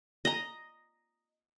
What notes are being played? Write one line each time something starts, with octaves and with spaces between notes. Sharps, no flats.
D#5 A#5